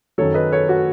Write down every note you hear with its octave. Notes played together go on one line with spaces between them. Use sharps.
F#2 D#3 F#3 A4 C#5
B4 D#5
A4 C#5
F#4 A4